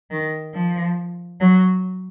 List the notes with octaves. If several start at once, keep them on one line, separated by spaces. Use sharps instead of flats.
D#3
F3
F#3